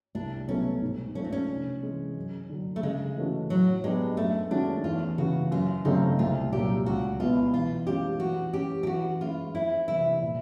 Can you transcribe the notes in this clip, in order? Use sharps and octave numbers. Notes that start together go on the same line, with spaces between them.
C2 D4
B2 F#3 A3 C#4
G#2
F3 A3 C#4 D4
C4
C#4
C3
E3 G#3
F#2
D3 F#3
A3
C#3 G#3
E3 A3 C#4 F#4
A2 F#3
F#3 G#3 B3 D4 G4
F#2 A3
D#3 G#3 C#4 D4 F#4
E2 F4
C#3 E3 F#4
F#2 F4
C#3 F#3 A3 C4 D#4
C2 F4
A#2 F#3 G4
C#2 F#4
B2 G3 B3 E4 F4
E3 F4
G#3 C#4 F4 G4
E3 F#4
G#3 C#4 G4
G4
E3 F#4
G#3 C#4 E4 F4
F2 E4
C3 E3 G3 E4
A#2